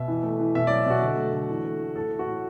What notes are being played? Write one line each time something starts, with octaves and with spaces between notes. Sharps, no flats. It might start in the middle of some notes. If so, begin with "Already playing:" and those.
Already playing: B2 E5
E3
A3
E3
B2 E5
F#3 D5
B2 F#4
D3
A3
D3
E3
A3
E3
A2 A4
A3
F#4
A2